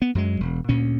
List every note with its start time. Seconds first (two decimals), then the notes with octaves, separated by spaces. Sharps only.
0.02 B3
0.15 F#2 F#3 G#3
0.40 E1
0.69 D2 A#2 C#4